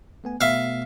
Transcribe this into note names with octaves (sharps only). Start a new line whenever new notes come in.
A3 B3 G#5
B2 A3 B3 E5 F5